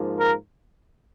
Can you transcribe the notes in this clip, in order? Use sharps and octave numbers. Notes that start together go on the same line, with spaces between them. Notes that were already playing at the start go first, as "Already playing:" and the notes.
Already playing: G#2 F3 A#3
A#4